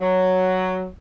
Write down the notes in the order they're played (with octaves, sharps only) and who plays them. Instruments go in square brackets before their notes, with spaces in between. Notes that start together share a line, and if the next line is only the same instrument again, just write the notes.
[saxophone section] F#3